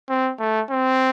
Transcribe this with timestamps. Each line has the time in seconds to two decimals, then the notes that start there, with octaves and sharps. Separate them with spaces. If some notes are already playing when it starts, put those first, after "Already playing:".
0.09 C4
0.39 A3
0.70 C4